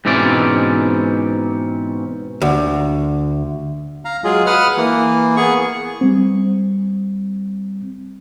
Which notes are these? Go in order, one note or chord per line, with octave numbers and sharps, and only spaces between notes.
G#2 B2 E3 C4 C#4 D5
D2
F5 A#5
F#3 G#3 F4 G#4
B4 F#5 D#6 F6
E3 A#3
B3 G#4 C#6
G3 C4